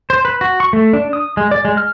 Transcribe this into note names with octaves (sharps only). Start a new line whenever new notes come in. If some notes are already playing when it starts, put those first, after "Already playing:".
C5
B4
F#4
C#6
A3
D4
D#6
G#3
D5
G#3
F6